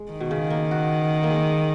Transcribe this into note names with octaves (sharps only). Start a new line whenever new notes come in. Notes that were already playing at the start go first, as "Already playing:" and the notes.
Already playing: G#3
D#3
B2
C#3
A#3
F#4
A#3
G#3